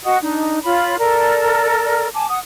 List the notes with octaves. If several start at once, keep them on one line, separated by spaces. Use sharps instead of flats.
F#4 D#5 F#5 D#6
D4 D#4
F4 C#5 B5
A4 A#4 D5
G#5 A5 D6
F#5 D#6